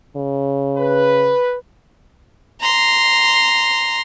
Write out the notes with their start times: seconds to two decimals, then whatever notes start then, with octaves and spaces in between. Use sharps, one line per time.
0.17 C#3
0.78 B4
2.61 A#5 C6